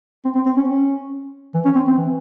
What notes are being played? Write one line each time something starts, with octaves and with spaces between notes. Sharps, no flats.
C4
C4
C4
C#4
C#4
E3
C#4
C4
C4
E3